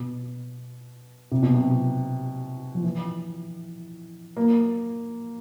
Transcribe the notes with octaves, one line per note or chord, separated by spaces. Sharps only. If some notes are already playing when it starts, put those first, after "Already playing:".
Already playing: B2
C3
B2
C3
F3
E3
A#3